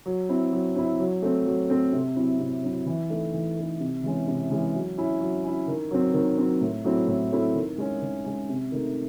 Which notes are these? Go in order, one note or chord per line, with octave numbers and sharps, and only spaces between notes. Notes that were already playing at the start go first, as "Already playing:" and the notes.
F#3
C4 E4
F#3
C4 E4
F#3
A3 C4
F#3
A3 C4
C3
F#3 C4 E4
C3
F#3 C4 E4
E3
A3 D#4
E3
A3 D#4
C3
E3 G#3 C#4
C3
E3 G#3 C#4
F#3
C#4 E4
F#3
C#4 E4
D#3
F#3 C4
D#3
F#3 C4
A2
F#3 A3 C4 E4
A2
F#3 A3 C4 E4
D#3
G#3 C#4
D#3
G#3 C#4
C3
D#3 A3 D#4